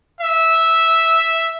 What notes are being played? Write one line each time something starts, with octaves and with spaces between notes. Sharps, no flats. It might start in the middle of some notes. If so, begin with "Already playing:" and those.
E5